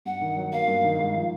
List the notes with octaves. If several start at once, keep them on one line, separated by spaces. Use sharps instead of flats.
G2 F#5
D#3
F#3
A#3 F5
G2
D#3
G#2
F3